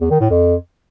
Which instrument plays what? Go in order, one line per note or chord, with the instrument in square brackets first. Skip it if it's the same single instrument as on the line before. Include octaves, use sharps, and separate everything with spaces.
[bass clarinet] E2
D#3
A2
F2